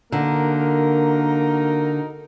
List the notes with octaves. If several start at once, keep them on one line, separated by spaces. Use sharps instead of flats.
D3 A#3 D#4 F#4 A#4